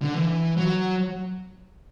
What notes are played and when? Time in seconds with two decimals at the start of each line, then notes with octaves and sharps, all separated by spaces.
0.02 D3
0.14 E3
0.57 F#3